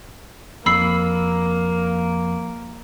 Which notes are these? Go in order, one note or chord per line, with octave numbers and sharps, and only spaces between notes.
F2 A#3 B5 E6 C7